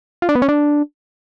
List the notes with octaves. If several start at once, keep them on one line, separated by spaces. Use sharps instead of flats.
F4
D4
B3
C#4
D4